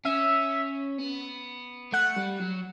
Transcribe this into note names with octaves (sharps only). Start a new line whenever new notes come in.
C#4 E5
B3
A3 F#5
G3
F#3